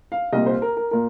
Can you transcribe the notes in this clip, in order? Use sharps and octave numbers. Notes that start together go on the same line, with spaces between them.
F5
C2 A#2 D#5
C5
A#4
A#4
A#2 A#4